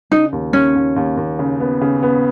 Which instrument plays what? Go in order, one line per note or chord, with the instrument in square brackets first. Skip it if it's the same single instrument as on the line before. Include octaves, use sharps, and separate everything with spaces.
[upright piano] C#3 [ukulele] D#4
[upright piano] D#2
[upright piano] D#2 [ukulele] C#4
[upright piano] D#2
D#2
D#2
C#3
B3
C#3
B3